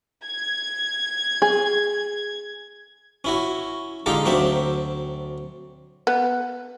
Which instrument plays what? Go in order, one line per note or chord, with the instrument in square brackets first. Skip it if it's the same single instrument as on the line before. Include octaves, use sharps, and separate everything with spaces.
[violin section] G#6
[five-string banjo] G#4
[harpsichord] C#4 E4 F#4
D3 G#3 D#4 F4 G4 A4
D2 F#3 C4 D4 E5
[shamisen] B3